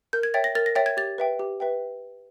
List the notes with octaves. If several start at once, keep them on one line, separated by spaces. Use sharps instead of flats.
A#4 G6
G#6
C#5 E5 G5 A6
A#6
A#4 A6
A#6
C#5 E5 G5 A6
G#6
G4 A6
B4 E5 G5
G4
B4 E5 G5